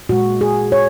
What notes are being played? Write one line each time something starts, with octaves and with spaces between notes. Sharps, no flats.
A#2 G#3 F#4
G#4
C#5